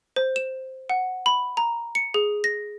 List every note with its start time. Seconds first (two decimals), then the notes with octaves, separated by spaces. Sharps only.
0.16 C5
0.36 E7
0.90 F#5
1.26 B5
1.57 A#5
1.95 C#7
2.14 G#4
2.44 A#6